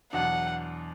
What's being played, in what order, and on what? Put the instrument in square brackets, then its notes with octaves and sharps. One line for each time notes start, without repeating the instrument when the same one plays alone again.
[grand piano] E2 B2 F#3 D4 [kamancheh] F#5